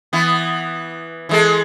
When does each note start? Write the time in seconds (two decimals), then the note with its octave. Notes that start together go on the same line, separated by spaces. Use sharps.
0.13 E3 B3
1.29 E3 G#3 A4